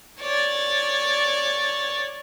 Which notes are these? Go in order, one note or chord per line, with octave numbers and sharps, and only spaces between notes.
C#5 D5